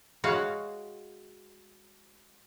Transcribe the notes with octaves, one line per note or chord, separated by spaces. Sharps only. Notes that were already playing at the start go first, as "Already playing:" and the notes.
G#3 F#4 C#5 F5